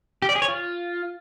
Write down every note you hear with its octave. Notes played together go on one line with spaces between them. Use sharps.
G4
D5
G#4
C#5
F4